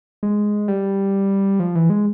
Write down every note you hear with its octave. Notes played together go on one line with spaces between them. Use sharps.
G#3
G3
F3
E3
G#3